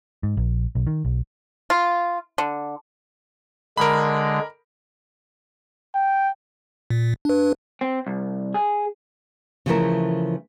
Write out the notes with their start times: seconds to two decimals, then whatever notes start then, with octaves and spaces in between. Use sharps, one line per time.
0.23 G#2
0.37 A#1
0.75 B1
0.87 D#3
1.05 B1
1.70 F4
2.38 D3
3.77 D3 G#3 A#4 B5
5.95 G5
6.90 A#2
7.25 D4 B4
7.81 C4
8.07 C2
8.54 G#4
9.66 C#3 E3 F3 A3 E4 A#4